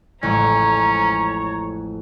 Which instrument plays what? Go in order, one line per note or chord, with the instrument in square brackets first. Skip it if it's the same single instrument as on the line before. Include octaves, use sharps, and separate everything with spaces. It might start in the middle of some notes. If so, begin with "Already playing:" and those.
[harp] A1 F2 G#3 [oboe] C#4 [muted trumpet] C#5 [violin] A#5